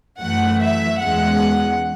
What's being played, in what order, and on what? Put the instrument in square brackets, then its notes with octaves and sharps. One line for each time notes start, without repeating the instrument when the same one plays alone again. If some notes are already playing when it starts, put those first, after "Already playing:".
[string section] F#2 E3 A3 F#5
E5
E2 B2 G#3 C#4 F#5